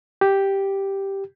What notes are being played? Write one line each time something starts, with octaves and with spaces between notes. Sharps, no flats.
G4